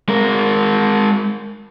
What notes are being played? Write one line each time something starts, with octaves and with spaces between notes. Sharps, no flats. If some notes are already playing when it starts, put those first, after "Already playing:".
G#3 A#4